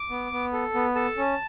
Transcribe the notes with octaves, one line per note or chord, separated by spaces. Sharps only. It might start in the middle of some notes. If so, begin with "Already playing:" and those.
Already playing: D6
B3
B3
A4
B3
A4 A5
C#4